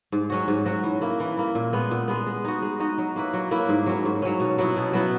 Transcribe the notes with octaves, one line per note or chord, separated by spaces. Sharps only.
G#2
F#3 C#4 F#4
G#2
F#3 C#4 F#4
E3
A#3 E4
E3
A#3 E4
A#2
G#3 B3
A#2
G#3 B3
G#3
D#4 F#4
G#3
D#4 F#4
F#3
A#3 E4 B4
F#3
A#3 E4 B4
G#2
F#3 C#4
G#2
F#3 C#4
B2
F#3 B3 E4
B2
F#3 B3 E4